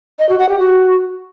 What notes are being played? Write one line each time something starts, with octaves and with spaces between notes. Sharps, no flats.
D#5
F#4
F#5
G4
F#4